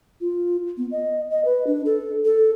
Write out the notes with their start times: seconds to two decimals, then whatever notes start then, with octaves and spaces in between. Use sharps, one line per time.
0.21 F4
0.78 B3
0.92 D#5
1.31 D#5
1.45 B4
1.67 D4
1.85 A4
2.25 A4